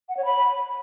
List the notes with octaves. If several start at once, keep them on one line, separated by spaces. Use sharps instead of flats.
F#5
C#5
B5